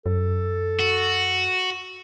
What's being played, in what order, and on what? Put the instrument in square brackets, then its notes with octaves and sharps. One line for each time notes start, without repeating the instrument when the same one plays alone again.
[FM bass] F#2 [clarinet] A4
[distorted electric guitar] F#4